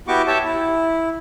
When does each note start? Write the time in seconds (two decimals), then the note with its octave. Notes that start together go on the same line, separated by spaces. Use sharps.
0.08 B3 E4 F#4 G4 C#6 D6
0.27 G4 C#5 E5 A5
0.45 E4